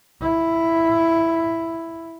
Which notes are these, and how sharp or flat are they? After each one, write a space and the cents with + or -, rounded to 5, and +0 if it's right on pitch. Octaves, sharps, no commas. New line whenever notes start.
E4 +5